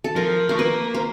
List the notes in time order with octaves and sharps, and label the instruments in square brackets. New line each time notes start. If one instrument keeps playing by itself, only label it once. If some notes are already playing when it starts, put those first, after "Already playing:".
[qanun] A4
[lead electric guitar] F3 [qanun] A#4
[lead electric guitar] A3 [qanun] A#4
[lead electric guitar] A#3 [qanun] B4
[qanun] C5